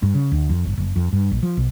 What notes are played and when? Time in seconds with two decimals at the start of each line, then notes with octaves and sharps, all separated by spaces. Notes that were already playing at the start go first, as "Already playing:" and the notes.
0.03 G2
0.14 C#3
0.32 D2
0.50 F2
0.65 G1
0.77 F#1
0.96 F2
1.13 G2
1.31 A#1
1.43 F3
1.57 B1